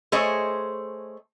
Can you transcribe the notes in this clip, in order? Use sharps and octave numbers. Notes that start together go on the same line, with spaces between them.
A3 G#4 C5 C#5 D#5